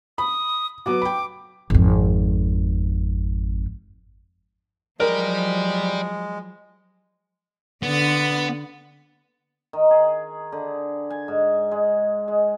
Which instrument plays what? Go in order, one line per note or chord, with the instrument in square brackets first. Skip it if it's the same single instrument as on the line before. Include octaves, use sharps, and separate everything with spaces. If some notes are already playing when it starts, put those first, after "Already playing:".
[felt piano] B5 [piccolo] D#6
[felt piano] F#3 B3 F#4 [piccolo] D6
[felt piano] G5 B5
[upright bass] G#1 F2
[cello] F3 F#3 [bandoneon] G#3 [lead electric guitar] G4 D5 [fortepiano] A#4
[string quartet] D3 A6 [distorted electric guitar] B3
[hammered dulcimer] D#3
G#4
D3
G#5
G#2
G#3
G#3